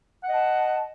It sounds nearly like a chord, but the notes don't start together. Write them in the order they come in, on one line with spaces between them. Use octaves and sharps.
F#5 D#5 A5